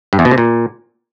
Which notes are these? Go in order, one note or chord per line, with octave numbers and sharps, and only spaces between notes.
G2
E2
B2
C3
A#2